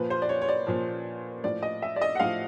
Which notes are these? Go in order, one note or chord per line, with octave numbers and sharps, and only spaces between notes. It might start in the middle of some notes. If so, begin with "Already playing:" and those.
Already playing: A#2 F3 B4
C5
D5
C#5
C#5
D5
A#2 F3
A2 F3 D5
D#5
E5
D5
D#5
F#5
A2 F3 F5